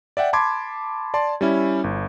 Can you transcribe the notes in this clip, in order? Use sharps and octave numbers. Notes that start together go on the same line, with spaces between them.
D5 E5 F#5 G5
A5 B5 C6 D6 G#6
D5 A5 C6
G3 C#4 E4
G1